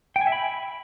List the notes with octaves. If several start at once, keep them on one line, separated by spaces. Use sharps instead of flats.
G5
G#5
E5
B5